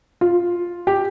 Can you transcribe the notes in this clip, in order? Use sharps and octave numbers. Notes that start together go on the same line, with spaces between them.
F4
G4